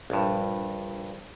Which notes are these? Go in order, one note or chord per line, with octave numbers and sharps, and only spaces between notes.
A#1 G2